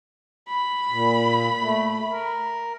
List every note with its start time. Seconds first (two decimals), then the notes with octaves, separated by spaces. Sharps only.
0.49 B5
0.90 A#2
1.61 A3
2.11 A#4